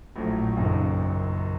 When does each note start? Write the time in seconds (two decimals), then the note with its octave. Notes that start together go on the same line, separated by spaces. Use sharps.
0.16 A#1 A2 F#3 A3
0.56 F#1 F#2 D#3